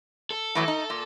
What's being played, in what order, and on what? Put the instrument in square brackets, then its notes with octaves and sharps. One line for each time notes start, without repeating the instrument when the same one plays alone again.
[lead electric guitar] A4
[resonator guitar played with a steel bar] A2 E3 F#3
D#4
A#2